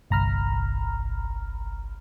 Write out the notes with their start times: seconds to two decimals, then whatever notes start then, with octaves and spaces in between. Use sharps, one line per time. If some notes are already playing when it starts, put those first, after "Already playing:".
0.10 G1 C2 A#5 B5 F6